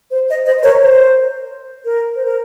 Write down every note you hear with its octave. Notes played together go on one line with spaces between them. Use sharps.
C5
C5 D#5
C5 D#5
C5
A#4 C#5
C5
A#4
C5
A#4